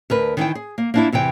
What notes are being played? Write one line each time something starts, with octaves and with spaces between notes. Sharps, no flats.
D2 A#4 B4
D#3 E3 E4 G5
G#4
A#3
A#3 D4 E4
E2 C3 E3 G5